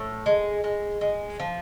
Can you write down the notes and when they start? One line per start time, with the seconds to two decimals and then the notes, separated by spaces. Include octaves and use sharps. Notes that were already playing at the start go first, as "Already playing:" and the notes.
Already playing: A2
0.26 G#3
0.64 G#3
1.01 G#3
1.40 F3